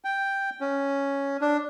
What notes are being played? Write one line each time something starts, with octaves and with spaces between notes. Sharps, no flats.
G5
C#4
D4